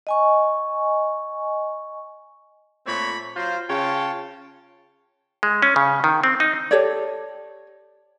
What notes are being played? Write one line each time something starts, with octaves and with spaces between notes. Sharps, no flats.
D#5 G#5 C#6
A#2 A3 C4 C#5 B5
F#3 F4 C5
C#3 F4 C#5 G5 A5
G#3
C#4
C#3
D#3
C4
D#4
G4 A4 C#5 D5